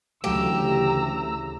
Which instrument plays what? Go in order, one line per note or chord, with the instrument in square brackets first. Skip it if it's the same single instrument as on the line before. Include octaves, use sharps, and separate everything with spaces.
[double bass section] D2 C#3 E3 [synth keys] F#3 A3 [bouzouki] G4 [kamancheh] A#5 E6